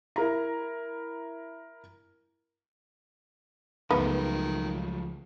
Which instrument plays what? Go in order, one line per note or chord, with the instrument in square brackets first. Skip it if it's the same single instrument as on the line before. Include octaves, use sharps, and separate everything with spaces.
[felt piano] E4 A#4 A#5
[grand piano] C#2 A3 [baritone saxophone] D#3 [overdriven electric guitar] F3 F#3 [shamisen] B3